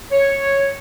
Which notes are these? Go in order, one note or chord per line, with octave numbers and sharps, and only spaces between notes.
C#5